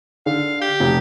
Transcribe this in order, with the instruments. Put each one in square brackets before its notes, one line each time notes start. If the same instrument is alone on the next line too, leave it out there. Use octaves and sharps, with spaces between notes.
[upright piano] D3 [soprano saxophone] F5
[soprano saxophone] G4
[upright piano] F1